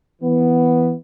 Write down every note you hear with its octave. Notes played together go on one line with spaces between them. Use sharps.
E3 B3